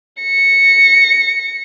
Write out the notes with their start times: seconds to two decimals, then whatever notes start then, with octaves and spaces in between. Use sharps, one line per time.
0.22 A#6 C#7